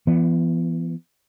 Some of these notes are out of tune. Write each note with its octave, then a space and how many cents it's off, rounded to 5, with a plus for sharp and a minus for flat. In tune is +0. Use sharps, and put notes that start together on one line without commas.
E3 +40 B3 +0